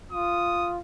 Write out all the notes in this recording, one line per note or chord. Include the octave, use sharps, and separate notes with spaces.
F4 D#6